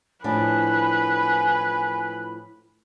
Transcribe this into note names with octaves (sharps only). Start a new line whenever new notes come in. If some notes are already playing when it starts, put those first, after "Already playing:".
A2 F3 D4 B4 G#5